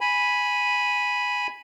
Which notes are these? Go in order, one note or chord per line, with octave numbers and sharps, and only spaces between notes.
G#5 B5